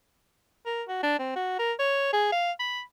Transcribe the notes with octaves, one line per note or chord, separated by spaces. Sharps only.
A#4
F#4
D4
C4
F#4
A#4
C#5
G#4
F5
B5